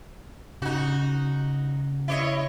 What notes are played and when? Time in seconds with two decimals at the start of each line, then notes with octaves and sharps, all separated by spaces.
0.62 C#3 D#4 F#4
2.08 E4 C#5 D#5